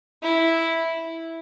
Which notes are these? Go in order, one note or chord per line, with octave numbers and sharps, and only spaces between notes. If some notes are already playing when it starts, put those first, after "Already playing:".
E4